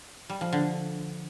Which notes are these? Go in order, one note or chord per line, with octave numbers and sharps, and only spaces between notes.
G3
F3
D3